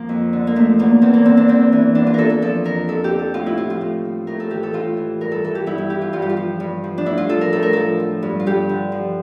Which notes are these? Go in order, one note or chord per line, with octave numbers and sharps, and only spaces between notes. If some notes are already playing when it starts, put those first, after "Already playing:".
Already playing: F3 A#3
F2
D3
A#3
F3 A3
E2 A#3
E2 C4
A#3
D3 C4
D4
E2 C4
E3
E2 D4
F4
E3 A4 A#4
A4
F3 A4
F2 A#4
F2 A4
G4
D3
A4
A2 F4
E4
F3 F4
F4
A2
F3
A2 A#4
A4
E3 G4
A4
A2 F4
E3
G2 A#4
A4
E3 A4
G4
G2 E4
E4
E3 G4
F4
G2 F4
G4
F4
F3
G2
F3
D4
A2 E4
F4
F3 A4
A#4
A2 A4
A#4
F3 A4
F3
G2
F4
G2 G4
D3
F3